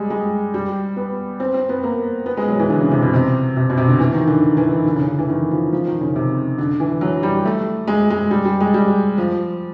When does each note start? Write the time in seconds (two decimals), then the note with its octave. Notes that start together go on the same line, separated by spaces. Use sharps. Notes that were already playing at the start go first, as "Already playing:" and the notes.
Already playing: G3 G#3
0.10 G#3
0.54 G3
0.96 B3
1.40 C4
1.54 C4
1.69 B3
1.83 A#3
2.26 B3
2.37 G#3
2.48 F#3
2.59 E3
2.70 D3
2.80 C#3
2.91 C3
3.02 B2
3.13 C3
3.57 C3
3.70 B2
3.77 C3
3.88 D3
3.99 E3
4.13 D#3
4.27 D3
4.57 E3
4.72 D#3
4.86 D3
4.96 C#3
5.08 D3
5.19 E3
5.29 D#3
5.51 F3
5.72 F3
5.87 D#3
6.01 C#3
6.16 C3
6.58 D3
6.80 E3
7.01 F#3
7.23 G3
7.45 A3
7.87 G#3
8.10 G#3
8.31 G3
8.45 G3
8.60 G#3
8.74 G3
9.18 F3